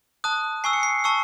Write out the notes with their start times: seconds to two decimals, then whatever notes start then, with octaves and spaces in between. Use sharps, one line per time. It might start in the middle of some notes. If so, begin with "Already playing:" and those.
0.24 A5 D#6 F#6
0.64 G#5 C#6 E6 C7
0.73 C#7
0.83 C7
1.04 A5 C#6 E6